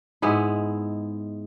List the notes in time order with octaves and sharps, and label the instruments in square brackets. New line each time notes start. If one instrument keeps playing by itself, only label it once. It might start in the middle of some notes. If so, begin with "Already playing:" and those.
[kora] G#2 G#3 B3 E4